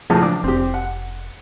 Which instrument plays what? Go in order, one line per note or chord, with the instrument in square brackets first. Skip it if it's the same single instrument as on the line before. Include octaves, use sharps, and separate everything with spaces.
[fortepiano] C#2 A2 G#4 [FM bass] F3
[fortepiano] D4 D6
[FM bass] F1 [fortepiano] C4 G4
[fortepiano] F#5